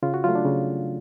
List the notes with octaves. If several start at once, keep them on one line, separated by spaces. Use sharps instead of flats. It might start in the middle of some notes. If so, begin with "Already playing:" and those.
C#3 F4
F#4
F#3 A3 F4
D4
C#3